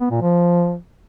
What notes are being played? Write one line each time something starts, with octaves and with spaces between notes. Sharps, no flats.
B3
A#2
F3